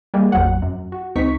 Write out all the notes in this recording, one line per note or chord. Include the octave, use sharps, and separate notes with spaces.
G3 G#3 A#3
A1 F2 F#3 F#5
F#2
F#4
C#2 C4 D#4 C#6 B6